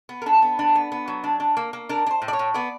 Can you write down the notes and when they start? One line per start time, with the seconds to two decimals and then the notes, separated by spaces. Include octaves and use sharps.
0.09 B3
0.22 A#4
0.26 D4 A4
0.42 B3
0.59 D4
0.75 B3
0.92 B3
1.08 F#3
1.24 D4
1.40 D4
1.57 A#3
1.73 A#3
1.89 D4 A#4
2.06 D4
2.11 C5
2.22 A2
2.28 D5
2.33 C#5
2.39 A2
2.54 B3 D5